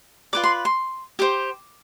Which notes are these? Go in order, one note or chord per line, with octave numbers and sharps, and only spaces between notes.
F4 B4 D5 D6
C6
C6
G4 C5 D6